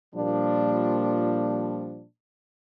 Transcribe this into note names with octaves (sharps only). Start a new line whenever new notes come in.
A#2 F3 G3 D4